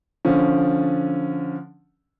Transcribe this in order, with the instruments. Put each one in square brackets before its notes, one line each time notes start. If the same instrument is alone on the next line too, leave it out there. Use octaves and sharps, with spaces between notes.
[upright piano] D3 F3 C#4